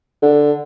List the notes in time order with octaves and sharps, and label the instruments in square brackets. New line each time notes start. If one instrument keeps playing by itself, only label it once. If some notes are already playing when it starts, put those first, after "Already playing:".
[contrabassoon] D3